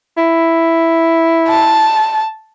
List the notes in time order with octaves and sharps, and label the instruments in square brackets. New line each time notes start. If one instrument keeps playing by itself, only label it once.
[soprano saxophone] E4
[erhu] A5